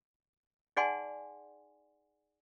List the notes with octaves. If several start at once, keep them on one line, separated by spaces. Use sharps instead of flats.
D#4 G#4 D5 F#5 G#5 C6